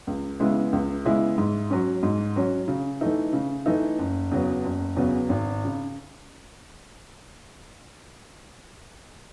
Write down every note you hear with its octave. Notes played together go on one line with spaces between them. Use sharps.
C#2
C#3 G#3 B3 E4
C#2
C#3 G#3 B3 E4
G#2
F#3 C#4
G#2
F#3 C#4
C#3
E3 A3 D#4
C#3
E3 A3 D#4
F#1
E2 C#3 F#3 B3
F#1
E2 C#3 F#3 B3
G#1
C#3